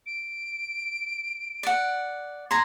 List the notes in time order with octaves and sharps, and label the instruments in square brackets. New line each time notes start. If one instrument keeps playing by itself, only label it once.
[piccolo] D7
[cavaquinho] D5 F#5
[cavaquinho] A#5 C6 [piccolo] G#6